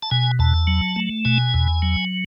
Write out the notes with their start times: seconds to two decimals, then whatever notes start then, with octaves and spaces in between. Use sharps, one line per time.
0.03 A5
0.11 B2 G#5
0.39 E2 A5
0.67 F#3
0.96 A3
1.25 B2 G#5
1.54 E2
1.82 F#3